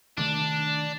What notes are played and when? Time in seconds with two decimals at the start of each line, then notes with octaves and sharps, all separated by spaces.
0.18 C3 D#3 A3 D4